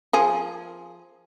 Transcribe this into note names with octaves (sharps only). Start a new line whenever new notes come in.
F3 G#4 A#4